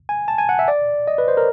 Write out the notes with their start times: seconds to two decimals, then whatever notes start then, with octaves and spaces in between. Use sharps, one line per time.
0.09 G#5
0.28 A5
0.38 G#5
0.49 F#5
0.59 E5
0.68 D5
1.07 D#5
1.18 B4
1.28 C5
1.37 A#4